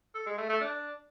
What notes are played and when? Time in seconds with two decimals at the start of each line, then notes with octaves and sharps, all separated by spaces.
0.15 A4
0.26 G#3
0.38 A3
0.49 A3
0.61 D4